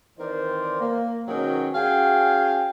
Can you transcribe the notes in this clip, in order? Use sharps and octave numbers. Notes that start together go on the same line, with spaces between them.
D#3 E3 C4 A#4 C5 D5
A#3
G#2 B2 D#3 F#3 C#4 G5
C#4 F#4 G#4 F5 G5 G#5